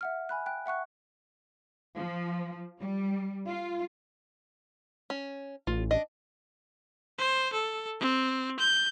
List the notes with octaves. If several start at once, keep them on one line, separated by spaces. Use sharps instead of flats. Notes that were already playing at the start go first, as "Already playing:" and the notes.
E5 F#5 F6
G#5 B5 F#6
G5 F#6
E5 F#5 C#6 F#6
F3
G3
F4
C#4
A1 F4
D4 D#5
C5
A4
C4
G6